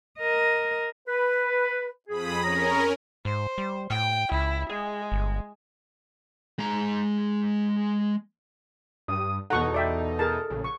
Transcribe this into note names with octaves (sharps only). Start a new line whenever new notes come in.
A#4 D#5
B4
F2 G#4 B5 D#6
C#4 G#4 A#4 C#5 A#5
G#2 C5
G3
A2 G5
C#2 E4
G#3 G#4
G1
G#3 A#5
G2 D#6
E2 B2 D#4 A4 F#5 C#6
D5 E5 G5
G#4 A#4 A5
A#1 C#3
C#6